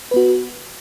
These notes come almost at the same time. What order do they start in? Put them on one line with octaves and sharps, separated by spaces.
B4 B3 F#4